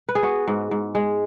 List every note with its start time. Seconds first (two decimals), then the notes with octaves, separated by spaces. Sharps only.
0.09 B4
0.15 G#4
0.23 B3 F#4
0.48 G#2
0.71 G#2
0.95 G#3